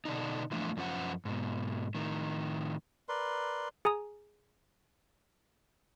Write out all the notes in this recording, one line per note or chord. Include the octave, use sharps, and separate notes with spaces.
B2 D3 D4 D#4
E3 F3 A3 D4 F4
F#2 F3 C#4 F4 C5 F#5
G#2 B2
A2 D#3
A#4 B4 D5 C6
G#4 G#5 A#5 D#6